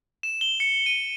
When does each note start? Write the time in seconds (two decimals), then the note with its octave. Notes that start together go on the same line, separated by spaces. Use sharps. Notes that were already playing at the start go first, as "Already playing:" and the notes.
0.23 E7
0.41 G7
0.60 C#7
0.86 D#7